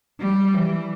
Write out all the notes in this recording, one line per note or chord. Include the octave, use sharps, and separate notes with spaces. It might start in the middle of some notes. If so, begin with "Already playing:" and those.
G3
E3